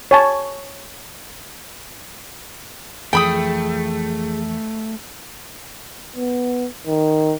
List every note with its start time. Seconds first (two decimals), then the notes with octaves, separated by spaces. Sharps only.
0.11 C#5 G#5 A5
3.13 F2 E3 F3 A3 G#4 G5 B5 D#6
6.16 B3
6.87 D#3